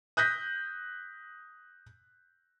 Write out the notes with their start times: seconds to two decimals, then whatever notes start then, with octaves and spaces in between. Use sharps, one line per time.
0.17 D#6 F#6 G6 A#6 B6